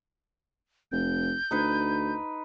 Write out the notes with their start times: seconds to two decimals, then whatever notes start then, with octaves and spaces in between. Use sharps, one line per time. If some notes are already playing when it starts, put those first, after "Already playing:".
0.92 F1 G6
1.51 D2 D#4 B4